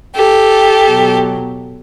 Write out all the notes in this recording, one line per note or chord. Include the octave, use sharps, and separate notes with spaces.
G4 A4
B2 F#3